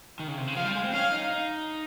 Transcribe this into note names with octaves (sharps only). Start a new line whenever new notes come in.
D#3
C#3
C3
C#3
F3 F5
G3
G#3
C4
C#4 F5
D#4
D#4